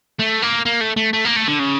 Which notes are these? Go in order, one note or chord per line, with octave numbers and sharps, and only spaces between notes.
A3
A#3
A#3
A3
A3
A3
A#3
A3
D3
C#3